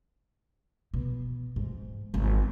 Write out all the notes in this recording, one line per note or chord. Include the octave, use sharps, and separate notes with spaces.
B2
G#2
G#1